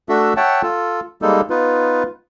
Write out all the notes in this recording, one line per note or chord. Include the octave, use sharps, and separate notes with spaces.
A3 D4 F#4 A4 E5
C#5 E5 F#5 G5 A5
F4 A4
G3 G#3 A#3 D#4 A4
B3 D#4 F4 B4